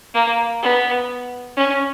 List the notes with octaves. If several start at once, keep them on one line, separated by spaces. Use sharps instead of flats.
A#3
B3
C#4